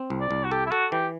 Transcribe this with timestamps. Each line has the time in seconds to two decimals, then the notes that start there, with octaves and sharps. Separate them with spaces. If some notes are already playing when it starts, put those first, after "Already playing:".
Already playing: C4
0.10 C2
0.20 D5
0.31 C2
0.44 F#4
0.51 G4 A4
0.66 E4
0.71 F#4 A4
0.92 E3 G4